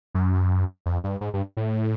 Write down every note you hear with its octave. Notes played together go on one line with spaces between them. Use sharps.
F#2
F2
G2
G#2
G2
A2